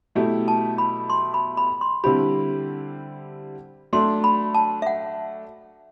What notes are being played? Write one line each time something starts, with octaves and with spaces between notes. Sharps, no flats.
B2 F#3 A3 E4 G4
A5
B5
C6
B5
B5
C6
D3 G3 C4 E4 G4 B5
F#3 A3 D4 C6
B5
A5
E5
F#5